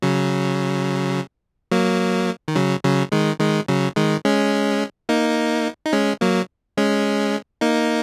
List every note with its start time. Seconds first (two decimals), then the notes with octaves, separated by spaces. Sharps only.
0.02 C#3 F#3
1.71 F#3 A#3
2.48 D#3
2.56 C#3 F#3
2.84 C#3 F#3
3.12 D#3 G#3
3.40 D#3 G#3
3.68 C#3 F#3
3.96 D#3 G#3
4.25 G#3 C#4
5.09 A#3 D#4
5.86 D#4
5.93 G#3 C#4
6.21 F#3 A#3
6.77 G#3 C#4
7.61 A#3 D#4